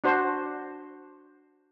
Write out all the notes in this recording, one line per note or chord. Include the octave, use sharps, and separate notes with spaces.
D4 F#4 C5